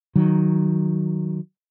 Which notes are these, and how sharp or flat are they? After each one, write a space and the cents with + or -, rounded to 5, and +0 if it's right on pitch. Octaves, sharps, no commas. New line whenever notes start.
D#3 +0 F#3 +0